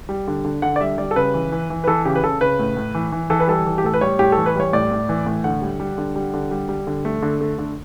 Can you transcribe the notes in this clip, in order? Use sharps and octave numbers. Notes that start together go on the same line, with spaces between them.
G3
D3
D3
D3 F#5
D5
G3 E5
G3 D5
A4
C#3 B4
E3
E3
E3
B4
E3 A4
C#3 G4
B4
C#3 A4
C#3 B4
A2
A2
E3
E3
E3 A4
B4
G3 A4
E3
G4
A2 A4
B4
G3 C#5
A2 G4
A4
E3
B4
G3 C#5
A2 D5
A2
E3
A2
D3 F#5
G3
G3
D3
G3
D3
G3
G3
D3
A3
D3
A3
D3